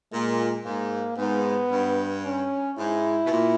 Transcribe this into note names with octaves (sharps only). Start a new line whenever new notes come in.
A#2 G#3
G#2 A#3
G#2 B3
G2
C#4
G#2 E4
B2
A#2